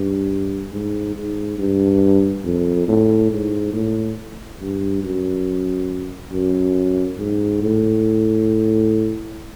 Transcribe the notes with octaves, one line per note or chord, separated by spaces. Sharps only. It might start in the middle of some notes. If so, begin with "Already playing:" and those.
Already playing: G2
G#2
G#2
G2
F2
A2
G#2
A2
G2
F#2
F#2
G#2
A2